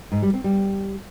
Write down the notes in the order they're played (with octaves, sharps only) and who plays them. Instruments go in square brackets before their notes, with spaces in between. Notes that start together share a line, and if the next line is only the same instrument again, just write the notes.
[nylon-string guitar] G#2
G3
C4
G3